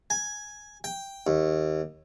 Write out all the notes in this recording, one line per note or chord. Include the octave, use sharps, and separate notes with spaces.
G#5
G5
D#2